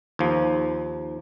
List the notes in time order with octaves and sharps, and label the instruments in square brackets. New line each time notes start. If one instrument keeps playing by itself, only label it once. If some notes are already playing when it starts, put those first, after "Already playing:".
[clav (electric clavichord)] D#2 F3